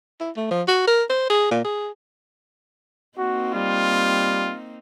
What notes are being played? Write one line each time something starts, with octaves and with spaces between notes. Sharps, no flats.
E4
A3
F3
F#4
A#4
C5
G#4
A#2
G#4
A#3 C4 D#4 F#4
G3 F4